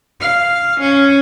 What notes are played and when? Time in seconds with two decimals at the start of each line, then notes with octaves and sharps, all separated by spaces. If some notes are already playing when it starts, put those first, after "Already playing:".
0.21 F5
0.80 C#4